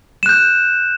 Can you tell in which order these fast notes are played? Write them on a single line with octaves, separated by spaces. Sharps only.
E7 F#6 G6